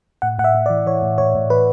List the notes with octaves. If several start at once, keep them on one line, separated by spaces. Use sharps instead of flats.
A2 F#5
A2 F#5
E5
A2
D5
E3
E3 C#5
A2
A2 C#5
A2
E3 B4